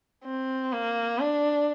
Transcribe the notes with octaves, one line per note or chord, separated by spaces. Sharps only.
C4
A#3
D4